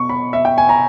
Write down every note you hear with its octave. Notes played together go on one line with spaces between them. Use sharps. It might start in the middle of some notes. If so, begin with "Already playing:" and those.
Already playing: B2 C#6
B5
E5
G5
G#5
A#5